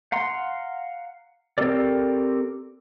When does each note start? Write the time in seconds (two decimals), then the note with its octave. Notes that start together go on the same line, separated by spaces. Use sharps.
0.12 F5 F#5 A#5 C6
1.58 C4 G4 A4 A#4 D5